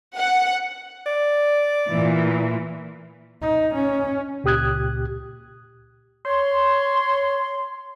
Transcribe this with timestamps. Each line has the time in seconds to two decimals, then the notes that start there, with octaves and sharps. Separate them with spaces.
0.16 F#5
1.06 D5
1.90 A#2 E3
3.42 D#4
3.74 C#4
4.44 C#2 A#2 G4 D#6 F#6 G#6
6.25 C#5 C6